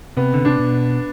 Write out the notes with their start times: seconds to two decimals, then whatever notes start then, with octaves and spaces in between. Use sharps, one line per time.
0.17 C3 B3
0.34 D3
0.45 C3 D4
0.59 B2